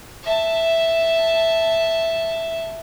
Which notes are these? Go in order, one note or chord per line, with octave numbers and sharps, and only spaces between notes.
E5 A5